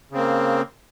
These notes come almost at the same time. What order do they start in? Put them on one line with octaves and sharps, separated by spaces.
C#3 C4 A#3